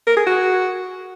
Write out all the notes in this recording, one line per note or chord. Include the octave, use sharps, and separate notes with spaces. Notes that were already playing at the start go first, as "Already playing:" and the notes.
A#4
G#4
F#4